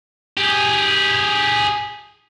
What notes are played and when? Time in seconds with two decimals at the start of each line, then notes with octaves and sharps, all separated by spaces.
0.38 G4 G#4